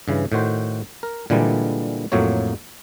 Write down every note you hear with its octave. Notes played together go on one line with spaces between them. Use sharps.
G2 C#3 E3
A2 D#3 F#4 C5
A#4
A#2 D3 E3 G3 G#3
F2 A2 F#3 A#3 C#5